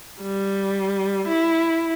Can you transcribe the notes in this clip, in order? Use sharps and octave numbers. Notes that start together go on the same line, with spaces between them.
G3
E4